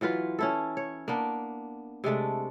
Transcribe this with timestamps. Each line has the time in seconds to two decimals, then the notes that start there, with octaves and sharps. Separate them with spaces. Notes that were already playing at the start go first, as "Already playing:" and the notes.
0.01 E3 F#3 F4 B4
0.39 C#4 E4 A4
0.77 C#5
1.08 A#3 B3 D4
2.04 C3 G#3 A3 D4